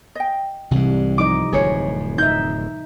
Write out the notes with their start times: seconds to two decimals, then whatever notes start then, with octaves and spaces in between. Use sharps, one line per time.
0.15 D#5 G5
0.71 C2 G#2 C3 E3 G3
1.18 F3 D#4 D#5 D6
1.52 D1 F2 A2 G#4 C#5
2.18 D#4 E5 G6